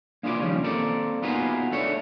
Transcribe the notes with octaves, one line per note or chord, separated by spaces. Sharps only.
A#3 D4 F4 G#4 B4 D5
D#3 F3 G3 C#4
A#3 C4 A4 D5
B3 D#4 F4 F#4 G#4 B4
A3 D4 C#5